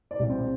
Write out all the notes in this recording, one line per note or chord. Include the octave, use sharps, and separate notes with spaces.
D5
C2
C4